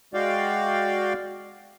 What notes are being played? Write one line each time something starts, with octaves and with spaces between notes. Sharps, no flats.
G#3 F#4 D5 F5 G5